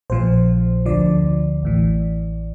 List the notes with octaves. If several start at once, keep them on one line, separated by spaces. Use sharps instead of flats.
A#1 A#2 F3 C5
D2 D3 F3 D5
A1 A2 E3